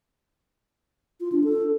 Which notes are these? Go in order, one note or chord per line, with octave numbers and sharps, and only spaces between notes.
F4
D4
A4